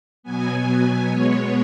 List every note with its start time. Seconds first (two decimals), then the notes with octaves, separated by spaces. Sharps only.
0.23 B2 F#3 B3 G#5
1.07 B2 G#3 B3 C#5